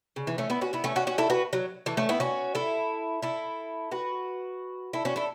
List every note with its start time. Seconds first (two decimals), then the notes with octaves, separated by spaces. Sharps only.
0.16 C#3
0.27 E3
0.38 A3 C#4
0.50 B3 E4
0.61 C#4 F#4
0.73 B3 E4
0.84 A3 C#4
0.96 C#4 F#4
1.07 C#4 F#4
1.18 E4 A4
1.30 F#4 B4
1.53 F#3
1.86 E3 A3
1.97 A3 C#4
2.09 B3 E4
2.20 C#4 F#4
2.55 E4 A4
3.22 E4 A4
3.92 F#4 B4
4.93 E4 A4
5.05 C#4 F#4
5.16 E4 A4